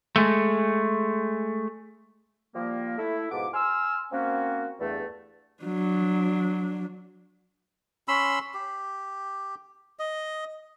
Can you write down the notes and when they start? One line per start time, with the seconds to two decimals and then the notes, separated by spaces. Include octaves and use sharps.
0.16 G#3 A3
2.55 F3 G3 A#3
2.98 A3 E4
3.31 G#2 B2 F3 F#5 D6
3.54 G#5 C6 E6 F6
4.12 A#3 C4 C#4 F#4
4.80 E2 G2 A3
5.63 F#3 D4
8.08 C#4 B5 C6 E6
8.54 G4
9.99 D#5